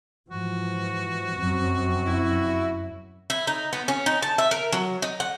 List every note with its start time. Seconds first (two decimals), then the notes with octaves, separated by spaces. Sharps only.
0.30 G#2 E3 F3 F#4
1.39 F1 F#2 F#3 C4
2.06 E4
3.30 E4
3.47 D#4
3.73 B3
3.88 C#4
4.06 D#4
4.22 A5
4.38 E5
4.51 A#4
4.72 F#3
5.02 D#4
5.20 F#5